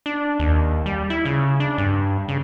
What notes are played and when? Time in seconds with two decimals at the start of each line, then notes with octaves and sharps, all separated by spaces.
0.06 D4
0.39 D#2
0.86 G3
1.10 E4
1.25 C#3
1.60 D4
1.78 G2
2.28 C#3